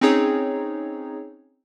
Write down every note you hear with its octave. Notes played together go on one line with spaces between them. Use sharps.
C4 C#4 D#4 G#4 C#5